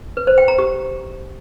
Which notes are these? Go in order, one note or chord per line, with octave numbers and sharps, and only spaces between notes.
B4
C5
G5
A#5
G4